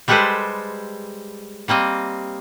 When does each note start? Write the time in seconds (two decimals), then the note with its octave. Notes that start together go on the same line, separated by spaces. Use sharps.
0.08 G3 G#3 G4 A4 B4 C5
1.68 G3 A#3 C4 D#5